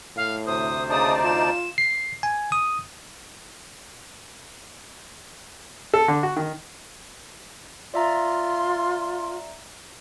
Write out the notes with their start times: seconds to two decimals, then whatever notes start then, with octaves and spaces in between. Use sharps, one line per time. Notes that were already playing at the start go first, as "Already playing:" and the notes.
0.16 A2 F5
0.47 D2 C3 C5 D#6
0.90 C#3 D#4 D5 A5 D#6
1.24 F4 E7
1.78 C7
2.23 G#5
2.52 D#6
5.94 A4
6.08 D3
6.23 F#4
6.36 D#3
7.94 F4 D5 E5 A#5 C6